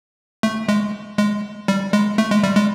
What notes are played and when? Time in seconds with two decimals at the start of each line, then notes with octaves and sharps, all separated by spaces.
0.43 A3
0.69 G#3
1.18 G#3
1.68 G3
1.93 G#3
2.18 A3
2.31 G#3
2.43 G3
2.56 G#3